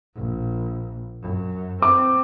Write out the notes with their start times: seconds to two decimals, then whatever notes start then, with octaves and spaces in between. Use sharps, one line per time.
0.15 A#1
1.22 F#2
1.82 C4 D6